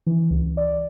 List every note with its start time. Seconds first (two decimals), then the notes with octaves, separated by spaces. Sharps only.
0.06 E3
0.30 C#2
0.57 D5